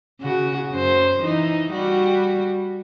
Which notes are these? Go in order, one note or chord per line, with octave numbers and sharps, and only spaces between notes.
C#3 F#4
F#2 C5
E3 D#4
G3 F#4